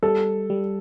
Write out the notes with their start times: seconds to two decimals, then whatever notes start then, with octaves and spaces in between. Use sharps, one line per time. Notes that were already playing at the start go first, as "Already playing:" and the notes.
0.03 G3 A4
0.50 G3